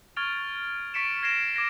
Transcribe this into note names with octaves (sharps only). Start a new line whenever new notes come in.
C#6 F6 G#6 A6 D7 F7
C#6 A6 B6 C#7 D7 E7
F6 G#6 A#6 C7 D7 E7
D6 G#6 A#6 C7